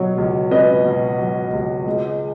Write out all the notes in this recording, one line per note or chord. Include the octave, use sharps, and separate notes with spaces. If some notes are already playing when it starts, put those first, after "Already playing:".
Already playing: B2 F#3 C#5
C#2
C#4 B4 D#5
B2
F#3
C#2
G#3